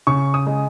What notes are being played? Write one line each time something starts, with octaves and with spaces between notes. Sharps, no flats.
C#3 C#6
D#6
G#3